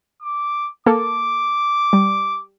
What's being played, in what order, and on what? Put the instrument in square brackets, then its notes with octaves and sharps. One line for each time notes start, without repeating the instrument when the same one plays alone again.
[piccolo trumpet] D6
[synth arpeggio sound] A#3 A4 [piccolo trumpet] D6
[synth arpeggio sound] G3